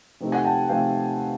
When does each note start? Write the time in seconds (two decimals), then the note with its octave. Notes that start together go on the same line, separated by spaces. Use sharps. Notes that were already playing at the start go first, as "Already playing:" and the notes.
0.20 C3 F3 A3 C4 D#4
0.32 F#5 G#5
0.45 G5 A5
0.69 C3 F3 A3 C4 D#4 F5 G5